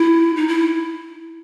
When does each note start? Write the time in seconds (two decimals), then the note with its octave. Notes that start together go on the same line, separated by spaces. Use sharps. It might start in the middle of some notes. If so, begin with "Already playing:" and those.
Already playing: E4
0.36 D#4
0.48 E4